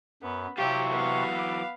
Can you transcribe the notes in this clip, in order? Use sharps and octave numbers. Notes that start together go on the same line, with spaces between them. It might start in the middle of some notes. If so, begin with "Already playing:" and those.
F#2 B3
C3 E3 F#3 F4 G4 C#6
B3 F5
D6